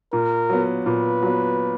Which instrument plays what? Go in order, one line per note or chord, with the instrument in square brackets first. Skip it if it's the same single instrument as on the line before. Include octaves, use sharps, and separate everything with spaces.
[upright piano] A#2 [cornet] A#4
[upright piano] F#3 B3
[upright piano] A#2 [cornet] B4
[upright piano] F#3 B3